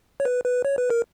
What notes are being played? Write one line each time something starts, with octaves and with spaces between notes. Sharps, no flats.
C#5
B4
B4
C#5
B4
A#4